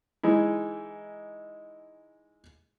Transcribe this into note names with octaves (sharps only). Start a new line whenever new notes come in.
E3 G#3 D#4 E4